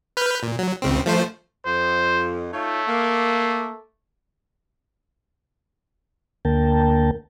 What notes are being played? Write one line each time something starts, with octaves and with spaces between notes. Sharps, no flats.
B4 F6 G6
A#2
F#3
C#2 C#3 C4
F3 A3 C5
F2 C5
A3 D#4 F4 C#5
A#3
D2 D3 A#3 A#4 G5 A5